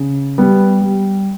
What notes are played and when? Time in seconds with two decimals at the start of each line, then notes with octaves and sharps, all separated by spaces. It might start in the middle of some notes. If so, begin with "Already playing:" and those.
Already playing: C#3
0.38 G3 B3
0.81 G3